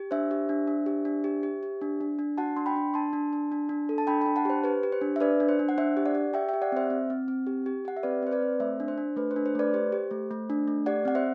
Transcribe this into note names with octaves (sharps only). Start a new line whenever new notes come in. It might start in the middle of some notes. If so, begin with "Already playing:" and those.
Already playing: G4
D4 C5 E5
G4
D4
D4
G4
D4
G4
G4
G4
D4
D4
D4
F#4 F#5 A5
D4 C6
G5 B5
D4
D4 A5 C6
D4
D4
D4
D4
A4
A5
D4 G5 B5
D4 G5 B5
F#5 A5
G4 C5
G4 B4
G4
C5
D4
E5
D4 B4 D5
D4
C5
D4
F#5
D4 C5 E5
G4
D5 F#5
G4
G4 E5 G5
G4 E5 G5
D5 F#5
C4 C5 E5
C4
C4
C4
G4
G4
G4 F#5
E5
C4 B4 D5
C4 C5
B4 D5
C4
A3 C5 E5
D4
C5
D4
A3 B4
C5
D4
C5
A3 B4 D5
G4 C5
G4
A3
A3
D4
A3
G4 D5 F#5
C4 F#5
C5 E5